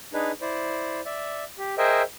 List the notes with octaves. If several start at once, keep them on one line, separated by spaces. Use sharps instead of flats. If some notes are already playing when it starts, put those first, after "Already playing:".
D4 D#4 G#4 B4
E4 C5 D5
D5 E5
G4
G#4 A#4 C5 D#5 E5 G5